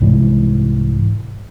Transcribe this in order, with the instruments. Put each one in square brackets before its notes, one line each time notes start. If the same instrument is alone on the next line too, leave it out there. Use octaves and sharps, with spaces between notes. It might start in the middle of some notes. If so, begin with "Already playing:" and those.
[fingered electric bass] C2 G#2 E3 G#3